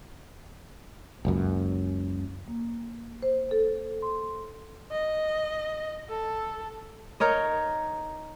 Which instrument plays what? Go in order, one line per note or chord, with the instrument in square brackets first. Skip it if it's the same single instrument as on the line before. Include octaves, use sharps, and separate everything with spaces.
[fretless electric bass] F#1 C#2 F#2
[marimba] A#3
C5
A4
C6
[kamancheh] D#5
A4
[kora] D#4 A#4 C#5 D#5